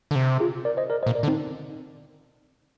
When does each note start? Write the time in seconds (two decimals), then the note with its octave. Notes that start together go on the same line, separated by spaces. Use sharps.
0.11 D3
0.15 C3
0.40 F4 G#4
0.65 A#4 D5
0.77 C5 D#5
0.90 A#4 D5
1.03 C5 D#5
1.06 A#2
1.15 A#4 D5
1.23 D3
1.28 C4 D#4